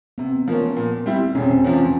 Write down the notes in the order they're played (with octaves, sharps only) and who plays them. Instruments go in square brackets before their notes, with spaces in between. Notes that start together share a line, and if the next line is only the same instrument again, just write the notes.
[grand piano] C3 [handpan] B3
[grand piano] F3 A#3 C#4
A#2
G3 C4 E4
[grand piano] E1 [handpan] C#4
[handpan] C4
C#4
[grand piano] E2 C3 F3